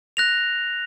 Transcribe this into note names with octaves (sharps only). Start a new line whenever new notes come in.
F#6 A#6 F7